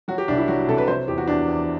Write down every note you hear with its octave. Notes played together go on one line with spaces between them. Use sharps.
F#3 F#4
G4
C2 D4
E4
F#3 F#4
C3 A4
B4
F#3 C5
E2 G4
F#4
E2 D4
E2